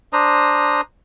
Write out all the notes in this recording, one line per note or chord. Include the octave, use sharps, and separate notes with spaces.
D4 C5 A#5 D#6